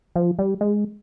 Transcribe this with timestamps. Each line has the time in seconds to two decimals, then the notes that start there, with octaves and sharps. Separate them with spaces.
0.16 F3
0.39 G3
0.61 G#3